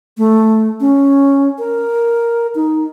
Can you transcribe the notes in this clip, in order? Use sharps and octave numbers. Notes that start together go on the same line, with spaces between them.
A3
C#4
A#4
D#4